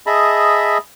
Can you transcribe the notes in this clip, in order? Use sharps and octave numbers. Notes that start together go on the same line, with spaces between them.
G#4 D#5 E5 A5 B5